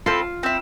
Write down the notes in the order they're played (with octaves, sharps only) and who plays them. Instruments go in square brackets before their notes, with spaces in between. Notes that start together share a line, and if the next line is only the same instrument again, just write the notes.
[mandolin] C4 E4 A4 [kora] F4
[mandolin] C4 E4